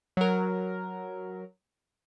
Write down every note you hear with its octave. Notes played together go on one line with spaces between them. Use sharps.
F#3 A#4